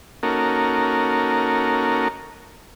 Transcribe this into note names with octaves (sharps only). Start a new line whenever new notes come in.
A#3 C#4 D#4 F#4 A4 A#4